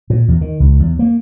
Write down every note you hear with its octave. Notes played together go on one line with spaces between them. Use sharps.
A#2
E2
D#3
C#2
E2
A#3